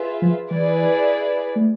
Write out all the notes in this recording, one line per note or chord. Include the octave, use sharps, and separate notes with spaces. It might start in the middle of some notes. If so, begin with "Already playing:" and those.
Already playing: F4 G#4 B4 E5
F3
E3 E4 G#4 B4 D5
A3